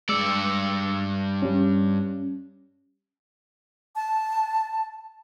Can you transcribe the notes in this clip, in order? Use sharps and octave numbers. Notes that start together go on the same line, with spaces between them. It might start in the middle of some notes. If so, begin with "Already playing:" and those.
G2 G#3 D5 E6 C#7
G3 C#4
A5